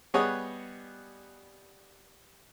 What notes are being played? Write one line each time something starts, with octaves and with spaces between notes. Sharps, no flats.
G3 B3 G#4 C#5 D#5 F#5